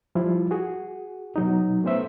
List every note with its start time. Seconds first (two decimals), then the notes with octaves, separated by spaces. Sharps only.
0.15 F3 G3 E4 F4
0.51 F#4 G#4
1.36 B2 F#3 D#4
1.84 A3 B3 C#4 C5 E5